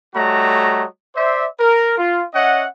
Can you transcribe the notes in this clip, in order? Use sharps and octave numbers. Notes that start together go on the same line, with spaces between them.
G3 A3 F#4 C#5 D#5 A#5
C5 D5 E5
A#4
F4
C#4 C#5 D#5 E5 F#5